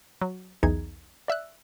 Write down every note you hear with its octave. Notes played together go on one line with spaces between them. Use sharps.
F#3
B1 E2 E3 D#4 G#4 G#6
D5 E5 E6 F#6